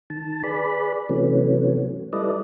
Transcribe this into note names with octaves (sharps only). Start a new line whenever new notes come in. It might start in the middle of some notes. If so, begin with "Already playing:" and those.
D#3 A5
G#4 B4 D5 B5
C3 E3 F#3 A3 B3 C#4
G3 E4 A4 B4 D5 D#5